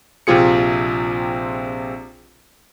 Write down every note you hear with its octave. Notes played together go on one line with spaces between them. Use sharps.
A#1 C3 C4 F4 G#4 C#7